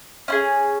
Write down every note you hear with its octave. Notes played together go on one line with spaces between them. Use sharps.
C#4 E4 G#4